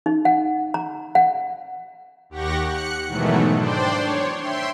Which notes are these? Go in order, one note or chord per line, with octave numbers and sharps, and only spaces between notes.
D#4
F#5
A#5
F#5
D#2 G4 F#5 C#6 A#6
F#6 C#7
G#2 B2 D#3 E3 F#3 A3
D4 C5 D5 G5 C6
C#5
E5 G5 C6